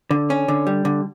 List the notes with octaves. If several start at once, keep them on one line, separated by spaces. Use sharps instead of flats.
D3
C#4
D3
G3
D3